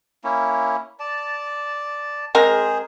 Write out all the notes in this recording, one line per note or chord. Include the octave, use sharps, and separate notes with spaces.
A#3 C#4 E4
D5 A5
G#3 C4 G#4 A#4 C5